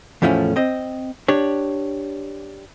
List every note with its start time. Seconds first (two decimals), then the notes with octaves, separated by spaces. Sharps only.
0.22 E2 A2 F3 A3 B3 C#4
0.56 C4 D#5
1.28 D4 G4 C#5